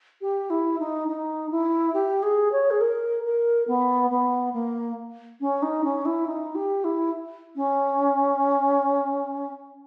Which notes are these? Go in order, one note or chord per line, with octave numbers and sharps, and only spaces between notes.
G4
E4
D#4
D#4
E4
G4
G#4
C#5
G#4
A#4
A#4
B3
B3
A#3
C#4
D#4
C#4
E4
D#4
G4
E4
C#4